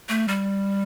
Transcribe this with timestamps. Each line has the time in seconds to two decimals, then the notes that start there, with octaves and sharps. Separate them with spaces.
0.09 A3
0.28 G3